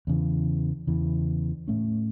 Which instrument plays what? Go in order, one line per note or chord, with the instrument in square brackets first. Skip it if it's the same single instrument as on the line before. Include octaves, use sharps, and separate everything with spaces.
[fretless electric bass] E2 C#3 E3
E2 C#3 E3
A2 A3 C#4